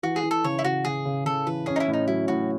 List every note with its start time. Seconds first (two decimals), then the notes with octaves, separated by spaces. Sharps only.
0.03 E3 F#4
0.16 G#4
0.23 E3
0.31 A4
0.44 C#3 C#5
0.59 E4
0.64 C#3 F#4
0.85 C#3 G#4
1.05 C#3
1.25 C#3 A4
1.47 E3 B4
1.66 C#4 G#4
1.76 D#4
1.80 E4
1.88 A2
1.93 D#4
2.07 F#3 E4
2.28 A2 F#4